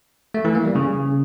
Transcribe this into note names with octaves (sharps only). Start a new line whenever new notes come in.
A3
E3
A#3
G3
C#3